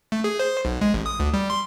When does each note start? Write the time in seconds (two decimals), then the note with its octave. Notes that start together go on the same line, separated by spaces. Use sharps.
0.12 A3
0.24 G#4
0.39 C5
0.65 B1
0.81 G#3
0.94 A1
1.06 D#6
1.20 D2
1.34 G3
1.50 C6